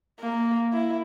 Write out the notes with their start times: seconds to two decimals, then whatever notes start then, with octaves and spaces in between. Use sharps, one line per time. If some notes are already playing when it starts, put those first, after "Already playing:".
0.21 A#3
0.73 E4